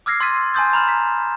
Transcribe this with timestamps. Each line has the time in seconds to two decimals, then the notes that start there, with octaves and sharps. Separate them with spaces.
0.06 D6 E6 F6 G#6 A#6 C7
0.20 C6 E6 G#6 A6 B6 D#7
0.54 G#5 A5 C6 D#6 G6 A6
0.73 A#5 B5 F6 E7
0.88 B6